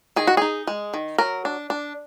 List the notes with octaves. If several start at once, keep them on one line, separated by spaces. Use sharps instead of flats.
D#3 G#4
F#4
D#4 G#4
G#3
D#3
F#3 A#4
D4
D4